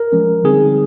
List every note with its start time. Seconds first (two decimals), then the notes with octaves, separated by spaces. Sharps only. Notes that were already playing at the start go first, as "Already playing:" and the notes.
Already playing: A#4
0.12 F3 G#3 C#4
0.44 D3 G3 C4 D#4 G#4